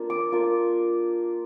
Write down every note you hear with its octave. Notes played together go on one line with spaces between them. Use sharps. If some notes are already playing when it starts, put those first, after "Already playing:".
Already playing: A#3 D4 F4
D6
A#3 D4 F4